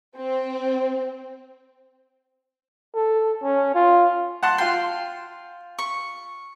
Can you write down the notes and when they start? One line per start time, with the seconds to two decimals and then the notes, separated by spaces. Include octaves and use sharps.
0.17 C4
2.95 A4
3.42 C#4
3.75 F4
4.43 F#5 A5 C6
4.58 F4 G5 C6
5.79 C#6